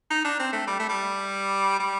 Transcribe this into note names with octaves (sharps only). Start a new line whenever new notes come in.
D#4
D4
C4
A3
G3
A3
G3
G3